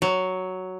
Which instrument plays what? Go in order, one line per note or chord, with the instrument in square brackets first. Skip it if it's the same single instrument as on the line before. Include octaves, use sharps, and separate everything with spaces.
[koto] F#3